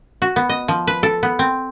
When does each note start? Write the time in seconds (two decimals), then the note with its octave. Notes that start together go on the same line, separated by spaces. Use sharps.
0.22 F#4
0.36 B3
0.49 D#5
0.68 F3
0.87 B4
1.03 A4
1.23 B3
1.39 C4